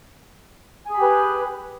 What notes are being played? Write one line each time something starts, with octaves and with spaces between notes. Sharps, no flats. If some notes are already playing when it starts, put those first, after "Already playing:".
G4 G#4 B4 G#5 B5